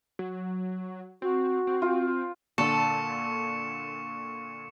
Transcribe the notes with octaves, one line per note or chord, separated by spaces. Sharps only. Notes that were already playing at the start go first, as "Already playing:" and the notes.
F#3
C4 F#4
C4
F4 G5
A#2 D3 A4 C#6 C#7 E7